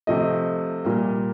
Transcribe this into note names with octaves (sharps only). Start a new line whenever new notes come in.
C3 F3 A3 D#5
A#2 G3 A#3